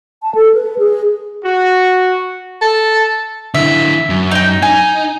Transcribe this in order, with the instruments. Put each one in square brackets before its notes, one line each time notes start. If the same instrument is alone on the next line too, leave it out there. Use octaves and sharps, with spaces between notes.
[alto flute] A5
A4
B4
G#4
[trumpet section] F#4
[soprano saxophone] A4
[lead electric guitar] D3 E4 [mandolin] E5
[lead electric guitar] F#2
[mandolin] D#4 G5
[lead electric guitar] D#4 [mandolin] G#5